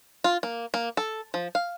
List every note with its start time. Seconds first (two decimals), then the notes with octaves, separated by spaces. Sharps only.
0.24 F4
0.43 A#3
0.74 A#3
0.97 A4
1.34 F3
1.55 F5